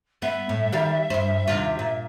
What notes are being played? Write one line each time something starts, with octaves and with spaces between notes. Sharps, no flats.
B3 E5
A2
D#3 G3 F5
G2 C5
D#2 C3 F4
A#2